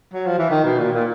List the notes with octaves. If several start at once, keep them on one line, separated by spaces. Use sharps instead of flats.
F#3
F3
E3
D#3
B2
A#2
A#2